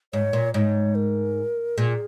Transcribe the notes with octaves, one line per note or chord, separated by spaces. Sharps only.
G#2 C#5
A#2
G#2 C#5
A#4
A#2 G#4